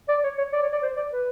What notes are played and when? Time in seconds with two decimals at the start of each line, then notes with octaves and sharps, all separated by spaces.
0.08 D5
0.23 C#5
0.38 C#5
0.52 D5
0.62 C#5
0.72 D5
0.83 C5
0.97 D5
1.13 B4